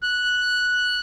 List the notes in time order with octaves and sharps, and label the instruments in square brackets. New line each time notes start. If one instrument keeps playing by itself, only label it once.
[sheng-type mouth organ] F#6